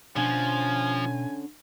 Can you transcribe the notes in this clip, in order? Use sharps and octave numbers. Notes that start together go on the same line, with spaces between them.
B2 D3 F3 C#4 G#5